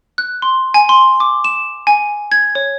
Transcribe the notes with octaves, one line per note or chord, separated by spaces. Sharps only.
F#6
C6
G#5
C6
D6
E7
G#5
G#6
C#5